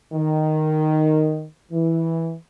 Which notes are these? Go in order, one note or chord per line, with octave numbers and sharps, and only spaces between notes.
D#3
E3